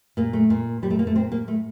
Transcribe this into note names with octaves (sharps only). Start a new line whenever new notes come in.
A#2 A#3
A3
A#2
A#2 G3
A3
A#3
A3
A#2 C4
A#3
A2 A3